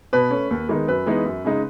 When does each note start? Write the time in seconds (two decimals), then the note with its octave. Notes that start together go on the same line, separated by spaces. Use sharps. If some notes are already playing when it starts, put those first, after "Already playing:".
0.13 B2 B4
0.31 A3 C#4
0.51 D#2
0.69 D#3 G#3 B3 D#4
0.87 F#2 B4
1.06 E3 G#3 B3 D#4
1.25 F#2
1.45 C#3 G#3 D#4